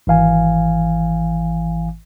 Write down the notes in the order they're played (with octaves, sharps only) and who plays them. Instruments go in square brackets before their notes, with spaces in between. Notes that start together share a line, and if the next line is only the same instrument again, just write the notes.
[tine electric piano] G#1 E3 F5 G#5